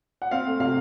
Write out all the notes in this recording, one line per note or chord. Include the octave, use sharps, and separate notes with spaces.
F#5
C4 F5
A3
C3 F5